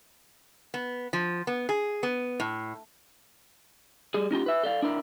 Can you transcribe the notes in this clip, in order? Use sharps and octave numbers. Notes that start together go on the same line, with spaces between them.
B3
F3
B3
G#4
B3
A2
G3 G#4
C#4 D#4 F4 G4
B4 E5
A4 D5 F5
D4 E4 A#4